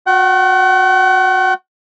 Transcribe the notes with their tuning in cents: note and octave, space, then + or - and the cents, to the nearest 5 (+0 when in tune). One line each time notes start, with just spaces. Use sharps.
F#4 -30 F#5 +40